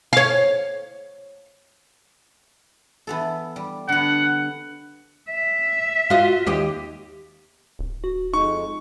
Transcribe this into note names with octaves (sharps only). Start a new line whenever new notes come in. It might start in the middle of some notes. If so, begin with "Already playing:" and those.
C#5 F5
E3 B3 A4
G3
D3 B3 F#5
E5
F4 F#4 D#5
D#2 G4 D#5
D1
F#4
F2 G#3 D#4 C#6